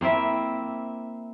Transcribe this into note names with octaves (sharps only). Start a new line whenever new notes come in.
A#3 C4 E4 E5